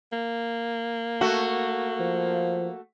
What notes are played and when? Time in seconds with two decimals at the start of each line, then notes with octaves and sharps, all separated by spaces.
0.12 A#3
1.21 A3 F#4
2.00 F3